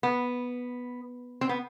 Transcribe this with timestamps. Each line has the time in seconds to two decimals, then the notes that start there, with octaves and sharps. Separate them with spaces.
0.03 B3
1.41 C4
1.49 B3